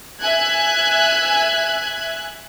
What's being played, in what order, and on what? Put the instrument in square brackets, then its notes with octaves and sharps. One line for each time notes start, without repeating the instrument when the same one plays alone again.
[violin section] E5 G#5 F#6 G#6